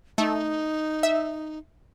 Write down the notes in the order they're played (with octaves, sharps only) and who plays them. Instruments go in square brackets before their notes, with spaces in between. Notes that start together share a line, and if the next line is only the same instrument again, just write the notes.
[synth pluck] A3 [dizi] D#4
[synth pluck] E5